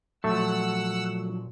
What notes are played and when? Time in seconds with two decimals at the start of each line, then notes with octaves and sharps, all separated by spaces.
0.24 A#2 F3 F#3 A3 A4 F#5 E6